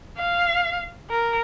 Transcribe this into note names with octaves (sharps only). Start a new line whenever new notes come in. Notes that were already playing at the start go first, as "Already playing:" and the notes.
F5
A#4